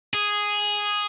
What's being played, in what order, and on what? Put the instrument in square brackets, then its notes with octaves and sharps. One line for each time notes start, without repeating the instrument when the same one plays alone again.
[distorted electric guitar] G#4